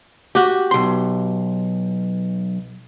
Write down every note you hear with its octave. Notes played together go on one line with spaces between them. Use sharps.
F#4 G4
B1 C6